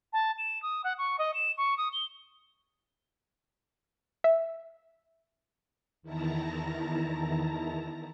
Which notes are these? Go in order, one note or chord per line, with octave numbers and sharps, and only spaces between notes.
A5
E7
D#6
F#5
C#6
D#5
E7
C#6
D#6
G7
E5
E2 D#3 E4 A5 A#5 A#6